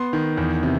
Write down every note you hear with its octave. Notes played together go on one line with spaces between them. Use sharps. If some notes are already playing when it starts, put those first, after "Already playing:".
Already playing: B3 C6
D#3
E2
C3